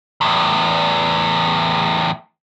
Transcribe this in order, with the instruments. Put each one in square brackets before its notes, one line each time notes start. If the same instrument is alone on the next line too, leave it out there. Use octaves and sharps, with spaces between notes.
[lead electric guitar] E2 A2